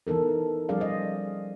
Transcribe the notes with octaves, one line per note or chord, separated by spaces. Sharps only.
E3 B3 D#4 A4 A#4
F3 G3 C#4 G#4 D5 F5
C5 D#5